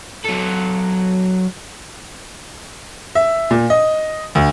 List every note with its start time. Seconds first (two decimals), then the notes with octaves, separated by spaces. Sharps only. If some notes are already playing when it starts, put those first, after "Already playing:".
0.24 F#3 A4
3.15 E5
3.51 A#2
3.70 D#5
4.35 D2